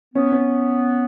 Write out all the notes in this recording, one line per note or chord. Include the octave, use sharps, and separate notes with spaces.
B3 C#4
C#4